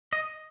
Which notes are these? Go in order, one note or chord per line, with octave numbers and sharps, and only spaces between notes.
D#5